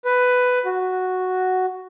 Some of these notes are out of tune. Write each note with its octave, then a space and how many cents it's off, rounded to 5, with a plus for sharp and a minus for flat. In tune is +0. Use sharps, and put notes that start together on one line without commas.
B4 +10
F#4 +0